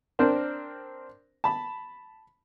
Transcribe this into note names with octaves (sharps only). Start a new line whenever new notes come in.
C4 D4 A#4 C5
A5 B5